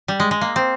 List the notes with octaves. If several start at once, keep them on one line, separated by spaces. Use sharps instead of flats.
G3
G#3
G#3
A#3
C4